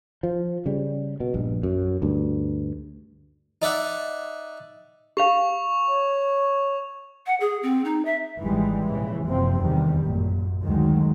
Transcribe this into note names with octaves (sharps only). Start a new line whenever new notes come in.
F3
C#3 G3
B2
A#1 G2
F#2
D2 G2
D#4 D5 E5 F#5
G4 F5 C#6 F7
C#5
F#5
G#4
C4
D#4
E5
G#1 G#2 E3 G3 G#3
A#1 C#3 E3
F#1 C3 F3 C4
E2 C3 D#3 G3
A1 F#2 A#2
D2 D#3 F#3 G#3